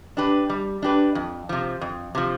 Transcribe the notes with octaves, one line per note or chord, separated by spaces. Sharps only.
D4 G4 B4
G3
D4 G4 B4
F2
C3 F3
F2
C3 F3